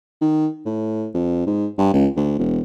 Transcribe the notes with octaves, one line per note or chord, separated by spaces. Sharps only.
D#3
A2
F2
G#2
G2
C#2
D2
E1